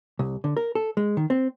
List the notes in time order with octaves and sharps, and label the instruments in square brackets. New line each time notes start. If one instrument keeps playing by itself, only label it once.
[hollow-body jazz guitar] C2
D3
A#4
A4
G#3
D#3
C4